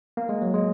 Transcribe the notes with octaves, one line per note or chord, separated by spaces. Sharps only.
A#3
G#3
F#3
G#3